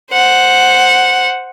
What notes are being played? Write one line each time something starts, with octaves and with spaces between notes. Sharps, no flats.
C5 F#5